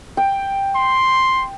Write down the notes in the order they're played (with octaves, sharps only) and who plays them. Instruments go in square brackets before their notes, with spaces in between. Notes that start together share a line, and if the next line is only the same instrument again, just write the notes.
[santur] G5
[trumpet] C6